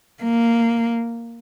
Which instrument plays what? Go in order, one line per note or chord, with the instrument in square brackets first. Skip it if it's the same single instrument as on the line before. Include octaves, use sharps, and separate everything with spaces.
[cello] A#3